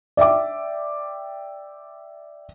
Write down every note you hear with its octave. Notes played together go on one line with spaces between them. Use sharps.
D5 E5 G5 D6